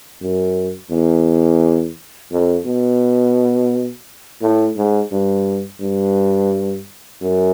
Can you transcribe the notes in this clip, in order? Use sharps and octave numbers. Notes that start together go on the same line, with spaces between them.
F#2
E2
F2
B2
A2
G#2
G2
G2
F#2